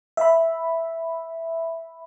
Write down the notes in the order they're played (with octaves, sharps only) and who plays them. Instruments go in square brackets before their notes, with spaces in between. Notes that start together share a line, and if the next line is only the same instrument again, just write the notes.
[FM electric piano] E5 B5